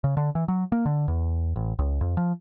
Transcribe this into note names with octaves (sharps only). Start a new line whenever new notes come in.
C#3
D3
E3
F#3
A#3
D3
E2
A1
C#2
F2
F3